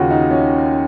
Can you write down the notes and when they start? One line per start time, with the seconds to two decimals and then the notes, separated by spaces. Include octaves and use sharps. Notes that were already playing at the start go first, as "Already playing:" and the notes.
Already playing: D#2 C#3 F4 F#4
0.10 D#4
0.31 C#4